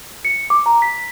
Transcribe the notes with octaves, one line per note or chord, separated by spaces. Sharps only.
C#7
D6
A#5
B6